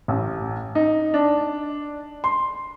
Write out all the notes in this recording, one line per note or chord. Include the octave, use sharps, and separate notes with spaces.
A1
D#4
D4
C6